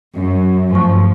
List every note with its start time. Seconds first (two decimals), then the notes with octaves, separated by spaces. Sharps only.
0.15 F#2
0.72 G2 F3 A3 C#6